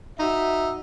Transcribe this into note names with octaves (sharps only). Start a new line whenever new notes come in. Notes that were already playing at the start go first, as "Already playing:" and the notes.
D#4 F#4 E5